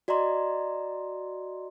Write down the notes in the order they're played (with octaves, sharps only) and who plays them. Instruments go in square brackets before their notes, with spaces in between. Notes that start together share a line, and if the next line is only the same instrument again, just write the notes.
[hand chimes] F#4 D5 D#5 A#5 C6